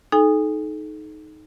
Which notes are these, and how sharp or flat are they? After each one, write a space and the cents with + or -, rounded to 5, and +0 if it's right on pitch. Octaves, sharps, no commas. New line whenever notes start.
D#4 +0 A4 -40 G#5 -30